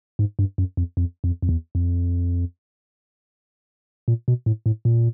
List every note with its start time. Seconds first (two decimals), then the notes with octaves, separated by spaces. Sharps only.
0.19 G#2
0.39 G2
0.58 F#2
0.77 F2
0.97 F2
1.24 F2
1.42 F2
1.49 E2
1.75 F2
4.08 A#2
4.28 B2
4.46 A2
4.66 A2
4.85 A#2